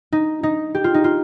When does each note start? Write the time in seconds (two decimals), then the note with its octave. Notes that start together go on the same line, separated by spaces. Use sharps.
0.12 D#4
0.43 D#4
0.75 G4
0.84 F4
0.94 D#4
1.04 F4